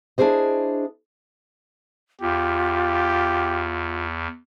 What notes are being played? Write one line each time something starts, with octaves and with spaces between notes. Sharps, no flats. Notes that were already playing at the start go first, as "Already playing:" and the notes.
D4 E4 G#4 C5 D#5
E2 F4 G4